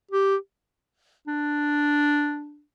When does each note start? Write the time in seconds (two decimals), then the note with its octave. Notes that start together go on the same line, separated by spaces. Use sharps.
0.11 G4
1.27 D4